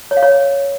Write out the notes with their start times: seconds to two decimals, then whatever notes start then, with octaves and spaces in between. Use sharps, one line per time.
0.11 C#5
0.17 F5
0.23 C#5